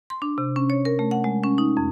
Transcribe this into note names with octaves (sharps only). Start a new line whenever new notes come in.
C6
D4
C3
C#4
C#5
A#4
A3
F#5
G#3
C#4
D#4
F2